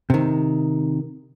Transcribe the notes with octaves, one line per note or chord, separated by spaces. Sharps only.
C3 D#3